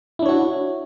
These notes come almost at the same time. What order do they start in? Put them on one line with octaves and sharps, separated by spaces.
E4 D4 C#5 F#4